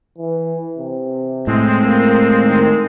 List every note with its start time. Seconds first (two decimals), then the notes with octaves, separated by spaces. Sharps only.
0.18 E3
0.79 C3
1.47 A2 G#3 C4
1.85 A#3
2.42 D#3